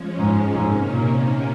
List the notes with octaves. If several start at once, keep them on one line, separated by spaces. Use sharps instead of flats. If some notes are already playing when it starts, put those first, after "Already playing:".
Already playing: F3 G#3 C#4
G#2
G#2 C3 D#3 A#3 C#4
A#2